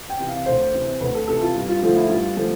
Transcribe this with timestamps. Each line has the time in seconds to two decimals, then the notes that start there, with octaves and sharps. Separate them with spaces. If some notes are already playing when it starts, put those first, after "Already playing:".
0.10 G5
0.19 C3 E3
0.29 F5
0.46 D2 C5
0.73 C3 E3
1.00 D2 B4
1.15 A4
1.28 C3 E3 A4
1.41 F4
1.55 G2
1.69 F4
1.82 D3 F3 A3 F4
1.96 E4
2.09 G2 F4
2.36 D3 F3 A3